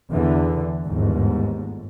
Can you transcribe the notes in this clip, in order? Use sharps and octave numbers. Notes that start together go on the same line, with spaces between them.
E2 D3 E3
G1 D#2 G#2